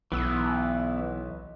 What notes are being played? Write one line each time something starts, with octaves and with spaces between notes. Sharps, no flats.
B1 E3 B3 E6